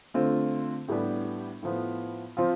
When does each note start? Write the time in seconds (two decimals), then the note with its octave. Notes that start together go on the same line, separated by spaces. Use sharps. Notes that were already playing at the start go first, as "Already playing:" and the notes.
0.14 D3 A3 C4 F4
0.88 A2 G3 B3 D4 G4
1.63 A2 F3 B3
2.37 F3 C4 F4